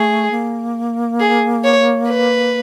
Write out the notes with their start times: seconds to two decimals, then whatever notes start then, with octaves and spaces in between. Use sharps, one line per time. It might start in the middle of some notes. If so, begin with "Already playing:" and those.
Already playing: A3 G#4
0.31 A#3
1.20 G#4
1.64 C#5
2.09 B4